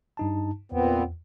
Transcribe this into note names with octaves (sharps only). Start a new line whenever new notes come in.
G2 D#4 A5
E2 A#2 B3 C4